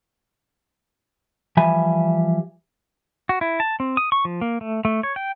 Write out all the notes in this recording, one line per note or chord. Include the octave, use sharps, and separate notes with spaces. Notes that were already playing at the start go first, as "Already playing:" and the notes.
E3 F3 G3 E5 G#5 B5
F#4
E4
A5
C4
D#6
C#6
F3
A#3
A3
A3
C#5
G5